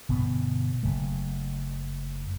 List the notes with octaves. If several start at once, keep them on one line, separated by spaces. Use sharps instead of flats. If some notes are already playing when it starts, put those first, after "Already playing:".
G1 B2 B3
F#1 A3